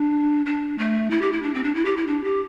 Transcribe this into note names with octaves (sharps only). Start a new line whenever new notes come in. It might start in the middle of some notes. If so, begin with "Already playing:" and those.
Already playing: D4
D4
A3
E4
G4
E4
D4
C4
D4
E4
G4
E4
D4
G4